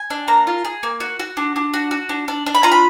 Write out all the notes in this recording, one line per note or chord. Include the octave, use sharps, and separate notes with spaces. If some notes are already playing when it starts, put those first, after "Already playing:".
Already playing: G#5
D4
A#3 A#5
F4
G#4
A#3
F#4
F#4
D4
D4
F#4
F#4
D4
D4
D4
B5
F4 A#5
B5